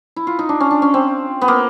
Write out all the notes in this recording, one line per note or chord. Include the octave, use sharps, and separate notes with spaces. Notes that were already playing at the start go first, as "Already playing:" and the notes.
E4
F4
D#4
D4
C#4
D4
C#4
C4
B3
A#3